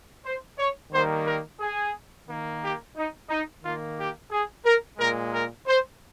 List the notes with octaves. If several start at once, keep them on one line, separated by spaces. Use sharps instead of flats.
C5
C#5
D#3 G3 A#3 C5
A#4
G#4
D#3 A#3
G4
D#4
D#4
D#3 A#3 F4
G4
G#4
A#4
A#2 G#3 A#4
A#4
C5